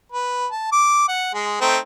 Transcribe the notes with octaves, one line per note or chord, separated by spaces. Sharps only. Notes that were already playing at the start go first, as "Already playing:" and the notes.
B4
A5
D6
F#5
G#3 G#4
A3 C4 D#4